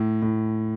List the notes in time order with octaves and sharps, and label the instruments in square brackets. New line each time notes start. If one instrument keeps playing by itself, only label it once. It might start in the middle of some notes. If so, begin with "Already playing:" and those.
Already playing: [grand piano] A2
A2